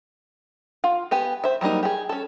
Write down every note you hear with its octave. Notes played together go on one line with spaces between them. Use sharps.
F4
B3 G4 G#5
C5 E5
F#3 G3 A#3 D#4
G4 G#4
C#4 A4